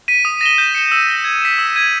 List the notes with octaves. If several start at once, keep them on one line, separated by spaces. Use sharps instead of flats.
B6 D#7
D#6
A#6 E7 G7
G6
C#7 E7 G7
E6
A#6 E7 G7
G#6
B6 E7
E6
G#6 D#7